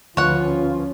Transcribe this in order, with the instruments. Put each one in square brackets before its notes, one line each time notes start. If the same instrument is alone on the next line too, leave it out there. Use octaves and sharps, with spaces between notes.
[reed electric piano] D2 B4 [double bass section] F3 C#4 [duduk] F4 [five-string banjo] C#5 F#5